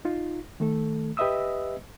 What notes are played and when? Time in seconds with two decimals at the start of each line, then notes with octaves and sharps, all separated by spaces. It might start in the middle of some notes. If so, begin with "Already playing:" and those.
0.05 D#4 F4
0.60 D#3 A3 A4
1.17 G4 B4 D#5 E5 D#6 E6